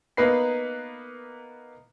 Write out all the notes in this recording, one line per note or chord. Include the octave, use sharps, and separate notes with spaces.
A#3 B3 D#4 B4 B5 C7